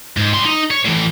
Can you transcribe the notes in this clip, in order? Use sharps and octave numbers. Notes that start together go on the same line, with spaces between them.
G#2
G3 C6
D#4
C#5
A2 E3